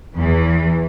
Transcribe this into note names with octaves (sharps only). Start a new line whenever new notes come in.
E2 E3